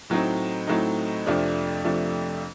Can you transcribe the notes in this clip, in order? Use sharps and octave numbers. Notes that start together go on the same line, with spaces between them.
A2 F#3 A3 C4 D#4
A2 F#3 A3 C4 D#4
F2 C3 F3 A3 D4
F2 C3 F3 A3 D4